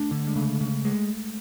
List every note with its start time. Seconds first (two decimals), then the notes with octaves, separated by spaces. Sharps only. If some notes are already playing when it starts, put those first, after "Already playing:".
Already playing: A3 D4
0.11 D3
0.27 G#3
0.36 C#3 A3
0.61 C#3
0.85 G#3